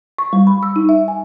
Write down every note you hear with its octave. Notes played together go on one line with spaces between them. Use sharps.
C#6
G3
B5
E6
D#4
E5
G#5